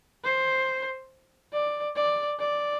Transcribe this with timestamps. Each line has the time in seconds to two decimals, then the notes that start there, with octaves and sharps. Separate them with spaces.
0.24 C5
1.53 D5
1.96 D5
2.39 D5